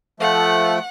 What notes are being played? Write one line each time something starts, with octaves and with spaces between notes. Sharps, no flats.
F3 A3 F#5